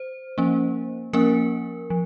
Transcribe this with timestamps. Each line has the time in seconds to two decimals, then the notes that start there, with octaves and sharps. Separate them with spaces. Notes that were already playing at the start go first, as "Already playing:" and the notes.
Already playing: C5
0.38 F3 A#3 C#4
1.13 F3 A#3 C#4 A#4
1.90 F3